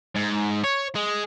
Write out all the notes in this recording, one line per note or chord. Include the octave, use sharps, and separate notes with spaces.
G#2
C#5
G#3